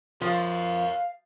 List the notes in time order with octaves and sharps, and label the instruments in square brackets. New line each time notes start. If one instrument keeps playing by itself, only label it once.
[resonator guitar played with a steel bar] F3 [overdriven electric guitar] A#4 C#5 [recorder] F5